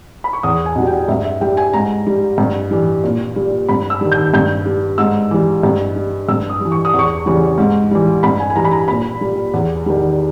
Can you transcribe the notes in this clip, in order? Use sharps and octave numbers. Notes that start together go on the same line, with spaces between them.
B5
C#6
E2 D#6
G#5
B2 G3
G5
G2 E5
E5
G3 G5
G#5
G#2 A#5
G3
G2
E3 G3
A#2
G3
G2 B5
E6
D#3 G3
G6
G2 G6
G3
G#2 E6
E3 G3
G2
G3
G2 E6
D#6
E3 G3
C#6
D#6
E2
C#6
C#3 E3 G3
G#2
E3 G3
G2 B5
G#5
G#5
E3 G3 A#5
B5
A#5
A#2 B5
G3
E2
D#3 G3